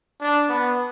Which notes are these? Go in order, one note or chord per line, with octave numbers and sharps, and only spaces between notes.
D4
B3